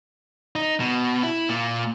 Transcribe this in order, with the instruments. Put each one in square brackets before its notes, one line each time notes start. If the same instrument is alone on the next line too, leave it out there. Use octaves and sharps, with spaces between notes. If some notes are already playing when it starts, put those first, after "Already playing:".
[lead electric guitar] D#4
B2
E4
A#2